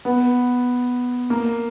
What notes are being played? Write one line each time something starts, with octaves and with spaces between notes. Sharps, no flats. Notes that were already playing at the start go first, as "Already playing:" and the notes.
B3
A#3